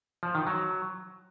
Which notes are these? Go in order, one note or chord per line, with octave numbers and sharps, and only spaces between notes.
F3
D#3
F#3